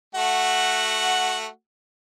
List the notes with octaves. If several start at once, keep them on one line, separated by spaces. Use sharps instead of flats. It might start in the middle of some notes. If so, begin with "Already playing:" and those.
A3 F#4 F#5